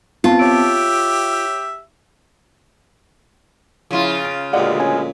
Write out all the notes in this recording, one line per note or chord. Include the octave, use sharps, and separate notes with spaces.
B3 C4 F4 A5
G4 C#5 E5 D7
C#3 F3 C#4 E4 F4
D7
D2 A#2 G#3 G4 D5 F5 F#5
C#4 G#5